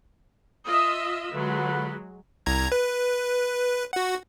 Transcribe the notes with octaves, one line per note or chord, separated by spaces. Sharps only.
F4 D#5 E5 D#6
D3 F#3 G#3 F4 B4
C2 A#5 G#6
B4
F#4 F#5